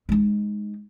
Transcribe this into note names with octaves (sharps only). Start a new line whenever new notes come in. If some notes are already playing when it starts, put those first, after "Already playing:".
G#3 D#4